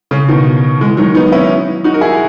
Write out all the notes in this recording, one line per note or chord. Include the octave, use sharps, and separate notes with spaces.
C#3
B2 D#3
E3 G#3
D#3 F#3
B3 D#4
C#4 E4
D#4 F#4
A#4
E4 G#4